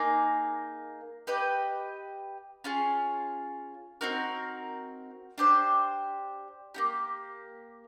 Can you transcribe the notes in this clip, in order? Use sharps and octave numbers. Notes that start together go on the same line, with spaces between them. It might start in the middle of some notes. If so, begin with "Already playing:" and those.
Already playing: A#3 D#4 G#4
G4 B4 D#5 G5
C#4 F4 G#4
C4 D#4 F#4 A#4
D4 G4 C5
A#3 D#4 G4